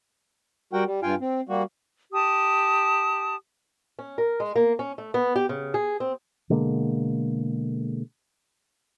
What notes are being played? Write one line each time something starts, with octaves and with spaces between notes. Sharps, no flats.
G3 F#4 A#4 F#5 G5
G3
G2 F4 F5 G5 G#5
C4
G3 A#3 F#4
G4 A5 D#6
C#4
A#4
G#3
A#3
C#4
A3
B3
G4
C#3
G#4
C4
B2 D3 G#3 A#3